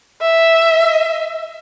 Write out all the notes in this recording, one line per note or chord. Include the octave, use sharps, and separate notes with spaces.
E5